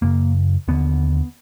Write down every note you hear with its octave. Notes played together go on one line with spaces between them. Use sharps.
F#2 C#3 A#3
D#2 D3 B3